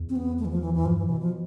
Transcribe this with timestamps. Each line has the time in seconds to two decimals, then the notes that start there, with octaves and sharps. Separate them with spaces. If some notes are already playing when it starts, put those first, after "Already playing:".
Already playing: E2
0.09 C4
0.16 B3
0.39 A3
0.45 E3
0.51 F3
0.62 E3
0.74 E3
0.85 G2 F3
0.97 E3
1.08 B2 E3
1.20 F3